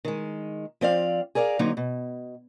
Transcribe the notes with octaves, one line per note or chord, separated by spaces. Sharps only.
D#3 G#3
F3 C4 D5 F5
G#4 A#4 D5 D#5 F5
D3 F#3 A#3 C4 D#4
B2